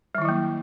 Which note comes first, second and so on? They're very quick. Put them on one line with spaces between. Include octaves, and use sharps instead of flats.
G3 D#3 E4 F#3 A#3